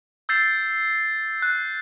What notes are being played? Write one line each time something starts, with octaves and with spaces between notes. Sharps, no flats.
E6 G6 A6 C7
F#6